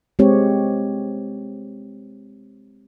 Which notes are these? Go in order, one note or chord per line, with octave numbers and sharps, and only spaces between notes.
G#3 C4 G4 C#5